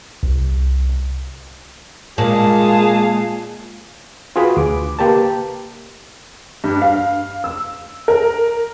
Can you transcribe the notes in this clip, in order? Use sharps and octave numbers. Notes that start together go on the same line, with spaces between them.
C2
A#2 G#3 G#4 F5 A5
F4 F#4 G#4 B4 B5
D2 D6
A#3 G4 B4 A5
G2
F5
E6
A#4